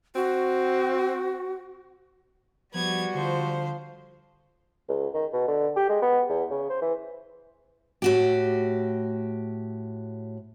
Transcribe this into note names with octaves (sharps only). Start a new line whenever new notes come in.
C4 F#4
F3 G3 B3 F#4 G#6
D3 F3 C5
C#2
D#3
B2
D3
G4
G#3
B3
E2
C#3
C5
E3
A2 F#4 G4